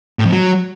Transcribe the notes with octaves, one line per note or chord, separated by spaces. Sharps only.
A2
F2
F#3